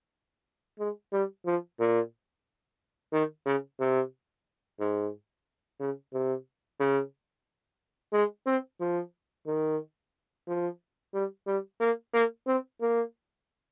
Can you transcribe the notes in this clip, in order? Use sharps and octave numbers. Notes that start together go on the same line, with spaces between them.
G#3
G3
F3
A#2
D#3
C#3
C3
G#2
C#3
C3
C#3
G#3
C4
F3
D#3
F3
G3
G3
A#3
A#3
C4
A#3